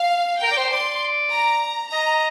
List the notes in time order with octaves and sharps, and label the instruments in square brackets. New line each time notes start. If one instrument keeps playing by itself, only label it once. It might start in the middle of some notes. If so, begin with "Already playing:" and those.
Already playing: [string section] F5
[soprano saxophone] A#4 [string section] G5
[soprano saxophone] D5
C5
[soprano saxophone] D5 [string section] C6
[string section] A#5
[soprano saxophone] D#5 [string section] A#5